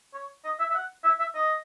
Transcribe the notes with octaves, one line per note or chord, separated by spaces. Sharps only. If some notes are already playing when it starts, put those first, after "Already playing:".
C#5
D#5
E5
E5
F#5
E5
E5
D#5